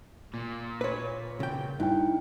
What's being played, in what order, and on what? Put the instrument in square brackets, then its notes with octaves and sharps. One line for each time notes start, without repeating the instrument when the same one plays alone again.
[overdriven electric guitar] A#2
[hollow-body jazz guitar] B4 C#5
C#3 G5
[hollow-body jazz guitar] G2 [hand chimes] D#4 E4 G5